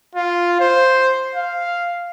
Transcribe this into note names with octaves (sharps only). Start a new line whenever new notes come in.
F4
C5
F5